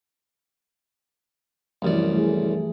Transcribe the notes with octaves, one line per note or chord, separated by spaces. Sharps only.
C2 F#2 E3 F3 A3 D5
A3 G#4